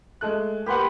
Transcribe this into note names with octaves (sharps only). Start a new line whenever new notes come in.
G#3 A3 F#6
A#3 G4 B4 F#5 C6